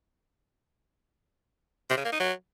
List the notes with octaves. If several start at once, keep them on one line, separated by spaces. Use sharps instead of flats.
C3
C#3
A#3
D#4
F#3